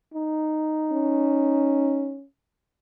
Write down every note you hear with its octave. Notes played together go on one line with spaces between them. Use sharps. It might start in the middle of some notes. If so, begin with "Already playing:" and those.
D#4
C#4